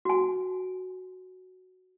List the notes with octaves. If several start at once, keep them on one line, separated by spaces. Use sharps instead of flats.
F#4 G#5